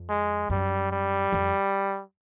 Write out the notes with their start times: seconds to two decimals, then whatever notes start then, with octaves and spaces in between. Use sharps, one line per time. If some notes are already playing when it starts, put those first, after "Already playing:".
Already playing: F2
0.09 G#3
0.50 F#2 G3
0.91 G3
1.32 F2